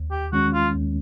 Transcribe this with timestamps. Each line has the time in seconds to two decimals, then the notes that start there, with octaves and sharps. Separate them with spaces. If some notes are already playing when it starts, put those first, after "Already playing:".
Already playing: D#2
0.11 G4
0.32 D#3 G#3 C#4 F#4
0.54 F4
0.74 D#2